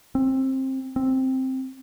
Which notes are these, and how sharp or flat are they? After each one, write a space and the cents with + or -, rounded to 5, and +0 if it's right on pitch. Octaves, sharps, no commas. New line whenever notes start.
C4 +20
C4 +5